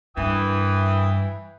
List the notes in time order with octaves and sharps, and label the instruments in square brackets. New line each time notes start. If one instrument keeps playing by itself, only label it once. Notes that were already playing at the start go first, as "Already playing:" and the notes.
[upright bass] G2 [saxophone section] E3 [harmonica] G5 D#6